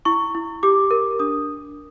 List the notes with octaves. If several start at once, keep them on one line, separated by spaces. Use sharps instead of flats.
E4 C#6
E4
G4 D6
A#4
D4 D#6